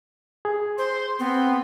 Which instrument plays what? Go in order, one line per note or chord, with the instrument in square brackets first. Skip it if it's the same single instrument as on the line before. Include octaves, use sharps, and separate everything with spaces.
[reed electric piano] G#4
[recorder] C5 [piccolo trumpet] C6
[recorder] B3 [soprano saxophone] C4 [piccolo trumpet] C6